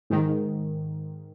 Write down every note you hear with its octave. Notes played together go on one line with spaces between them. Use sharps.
G#2 D#3